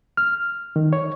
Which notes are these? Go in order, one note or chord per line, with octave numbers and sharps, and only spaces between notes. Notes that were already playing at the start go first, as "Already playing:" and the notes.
F6
D#3
C#5